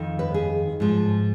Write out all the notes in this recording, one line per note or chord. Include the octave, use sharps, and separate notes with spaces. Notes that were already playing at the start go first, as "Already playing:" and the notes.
Already playing: F2 D#3
B4
G#4
G#2 F3